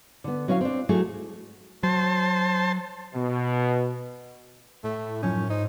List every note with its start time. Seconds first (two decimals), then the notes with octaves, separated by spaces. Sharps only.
0.24 D3 B3
0.48 F#3 C#4 E4 C#5 F5
0.61 C4 D4
0.89 F#3 A3 E4 G#4
1.83 F#3 C5 A5
3.15 B2
4.84 A2 A3
5.23 F#2 F3 C#4 D#4
5.50 G#2 D#4 C5